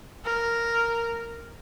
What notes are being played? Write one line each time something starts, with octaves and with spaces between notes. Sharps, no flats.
A#4